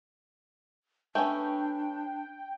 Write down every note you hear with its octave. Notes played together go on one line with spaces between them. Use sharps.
A3 B3 C#4 D4 G5